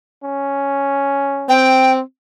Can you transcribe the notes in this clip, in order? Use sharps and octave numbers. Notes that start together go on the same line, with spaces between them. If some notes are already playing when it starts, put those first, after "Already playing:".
C#4
C4 G5